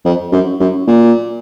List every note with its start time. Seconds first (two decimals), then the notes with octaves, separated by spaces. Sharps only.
0.05 F2
0.32 F#2
0.60 F#2
0.87 A#2